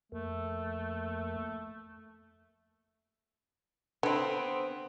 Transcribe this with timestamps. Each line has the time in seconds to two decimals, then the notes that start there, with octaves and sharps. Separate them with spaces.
0.12 F2 A3 A#3
4.03 D3 B3 C4